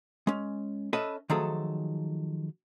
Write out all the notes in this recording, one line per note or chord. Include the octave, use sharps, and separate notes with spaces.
G#3 C#4
C#4 A4 B4 D#5 E5
D#3 F3 F#3 A3 G#4 A4